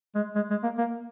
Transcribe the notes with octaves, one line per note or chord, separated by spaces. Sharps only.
G#3
G#3
G#3
A#3
A#3